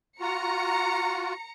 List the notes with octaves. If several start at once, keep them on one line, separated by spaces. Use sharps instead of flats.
F4 F#4 A#5 C#7